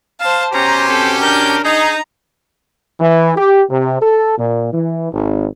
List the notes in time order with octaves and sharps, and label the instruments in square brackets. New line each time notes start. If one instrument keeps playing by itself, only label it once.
[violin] C5 A5 [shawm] F5
[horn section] B2 C#4 G4 [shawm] C5 [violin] A#5
[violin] C4 A4
[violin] D4 G6 [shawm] A#4
[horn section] D#4 [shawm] G#4 [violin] A#5
[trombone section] E3
G4
C3
A4
A#2
E3
G#1